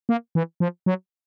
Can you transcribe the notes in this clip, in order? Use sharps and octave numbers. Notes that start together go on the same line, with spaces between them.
A#3
E3
F3
F#3